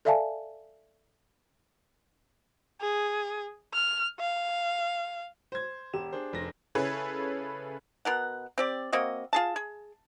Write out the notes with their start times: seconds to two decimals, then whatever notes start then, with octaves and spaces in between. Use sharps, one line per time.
0.05 A4 D5 E5 F5 G#5 A5
2.81 G#4
3.74 F6
4.19 F5
5.52 C5 G#6
5.94 E1 G4 E7
6.13 D4 G#4 C5
6.33 F1 A#6
6.75 C#3 E4 G#4 A4 B4 C#5
8.05 B2 A#4 F#5
8.58 C4 G4 D5
8.92 A#3 C4 F#4 D#5
9.33 F4 G#4 A5
9.56 G#4